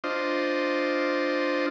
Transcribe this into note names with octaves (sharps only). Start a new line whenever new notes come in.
D4 F4 C5 D#5